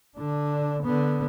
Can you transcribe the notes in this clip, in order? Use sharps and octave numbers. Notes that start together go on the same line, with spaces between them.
D3 D4
D3 B3